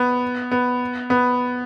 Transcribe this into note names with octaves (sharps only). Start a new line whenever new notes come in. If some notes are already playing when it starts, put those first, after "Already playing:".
Already playing: B3
B3
B3